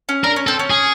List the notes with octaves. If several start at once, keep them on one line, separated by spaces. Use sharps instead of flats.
C#4
D4 A#4
C#4
C4 A4
C#4
G#4